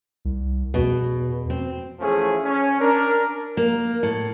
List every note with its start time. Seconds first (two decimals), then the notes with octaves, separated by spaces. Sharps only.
0.25 C2
0.74 E2 B2
1.50 C4
2.00 E3 F3 A3 C#4 G#4
2.44 C#4
2.81 D4 A#4
3.57 A#3
4.03 A2